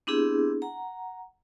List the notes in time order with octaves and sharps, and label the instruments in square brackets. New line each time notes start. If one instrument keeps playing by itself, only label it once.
[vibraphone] B3 C4 D4 E4 G4 G#4
F#5 A#5